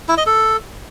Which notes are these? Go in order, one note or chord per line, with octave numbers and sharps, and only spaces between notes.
E4
D#5
A4